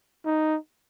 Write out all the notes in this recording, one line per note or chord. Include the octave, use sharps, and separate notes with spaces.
D#4